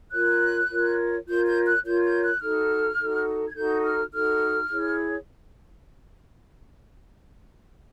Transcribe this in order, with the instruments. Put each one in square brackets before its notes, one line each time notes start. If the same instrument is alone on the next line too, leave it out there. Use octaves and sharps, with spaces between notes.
[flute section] F4 A#4 C#5 F#6
F4 A#4 C#5
F4 A#4 C#5 G6
G6
F#6
F4 A#4 C#5 G6
G6
F#6
D#4 F#4 A4 F6
D#4 F#4 A4
G#6
D#4 F#4 A4 G6
F6
D#4 F#4 A4 F6
E4 G#4 C#5